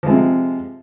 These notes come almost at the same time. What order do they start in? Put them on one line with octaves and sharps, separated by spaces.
F3 G#3 C3